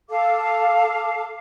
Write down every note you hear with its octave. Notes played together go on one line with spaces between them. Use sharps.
A4 F5 A5 D6